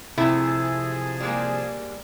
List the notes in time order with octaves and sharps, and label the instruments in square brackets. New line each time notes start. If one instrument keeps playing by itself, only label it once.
[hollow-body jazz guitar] C3 [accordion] F3 G#4 A5 [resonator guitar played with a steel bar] A3 [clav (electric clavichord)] E4
[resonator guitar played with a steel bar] G3 G#3 A#3